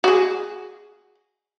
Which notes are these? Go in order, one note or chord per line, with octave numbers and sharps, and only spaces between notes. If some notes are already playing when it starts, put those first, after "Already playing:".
F#4 G#4